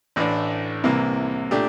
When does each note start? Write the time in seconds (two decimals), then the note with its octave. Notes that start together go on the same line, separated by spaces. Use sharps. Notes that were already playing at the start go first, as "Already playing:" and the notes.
0.16 A1 A2 E3 A3 D4
0.84 C2 C3 E3 A#3
1.51 A#2 A3 D4 G4